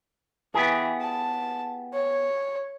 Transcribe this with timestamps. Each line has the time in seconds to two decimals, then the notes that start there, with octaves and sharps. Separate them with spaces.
0.54 E3 B3 G4 G#4
1.01 A5
1.94 C#5